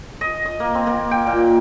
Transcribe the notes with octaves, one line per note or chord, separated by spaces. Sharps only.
D#5
D#5
A#3
C4
A#3
G5
A#2